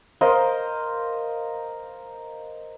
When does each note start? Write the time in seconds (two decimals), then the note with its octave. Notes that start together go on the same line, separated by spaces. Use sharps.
0.21 A#4 C5 D#5 F5